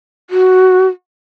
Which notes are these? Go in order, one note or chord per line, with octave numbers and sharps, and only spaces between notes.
F#4